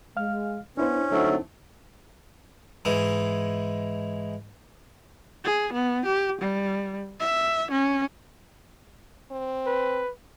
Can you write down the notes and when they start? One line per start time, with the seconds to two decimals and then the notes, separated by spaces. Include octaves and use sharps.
0.17 G#3 F5 F6
0.77 B3 C#4 D4 E4 C5
1.11 D3 F#3 A3 C4 D#4
2.85 G#2 E3 G#3
5.45 G#4
5.73 B3
6.05 G4
6.41 G3
7.20 E5
7.71 C#4
9.32 C4
9.67 B4